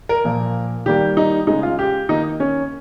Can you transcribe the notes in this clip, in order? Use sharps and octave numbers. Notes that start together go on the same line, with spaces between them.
A#4
A#2 F3 A#3
D#3 G3 A#3 G4
D#4
C#3 G#3 D#4
F4
G4
D#3 A#3 D#4
C#4